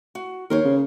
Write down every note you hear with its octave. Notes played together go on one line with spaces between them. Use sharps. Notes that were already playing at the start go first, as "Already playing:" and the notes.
F#4
D#2 A#4 C5 C#5
C#3